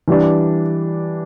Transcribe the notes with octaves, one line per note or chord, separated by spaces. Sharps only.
E3 G3 D4